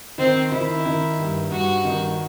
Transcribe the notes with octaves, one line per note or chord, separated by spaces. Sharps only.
D#3 C4
D#3 E4
D#3
G2
G2 F#4
D#3